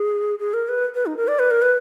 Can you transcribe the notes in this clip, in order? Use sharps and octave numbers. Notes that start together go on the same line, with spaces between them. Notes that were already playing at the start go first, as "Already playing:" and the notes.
Already playing: G#4
G#4
A#4
B4
B4
D#4
A#4
D5
B4
A#4
B4